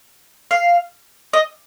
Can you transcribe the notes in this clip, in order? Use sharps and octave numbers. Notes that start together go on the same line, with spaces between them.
F5
D#5